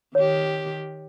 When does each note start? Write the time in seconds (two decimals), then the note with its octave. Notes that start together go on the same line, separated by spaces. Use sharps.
0.15 D#3 G4 C#5